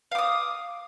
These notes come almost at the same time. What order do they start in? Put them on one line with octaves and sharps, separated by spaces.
F5 D6 D#6